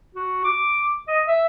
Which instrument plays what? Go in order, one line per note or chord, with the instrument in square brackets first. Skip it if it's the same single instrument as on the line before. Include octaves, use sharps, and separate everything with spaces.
[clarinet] F#4
D6
D#5
E5